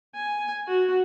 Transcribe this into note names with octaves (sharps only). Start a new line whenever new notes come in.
G#5
F#4